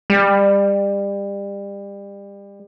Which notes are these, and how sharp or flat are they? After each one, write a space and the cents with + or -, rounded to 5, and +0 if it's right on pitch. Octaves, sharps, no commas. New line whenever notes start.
G3 +30